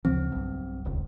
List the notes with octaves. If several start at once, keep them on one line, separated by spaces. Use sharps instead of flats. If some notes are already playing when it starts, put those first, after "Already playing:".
D2 C#3 F3 C4
B1 G2
D#1 C#2